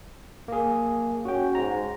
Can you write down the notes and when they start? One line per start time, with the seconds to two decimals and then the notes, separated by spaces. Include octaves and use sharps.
0.48 A#3 G#4
1.25 C#4 F#4 G5
1.55 G#2 A#5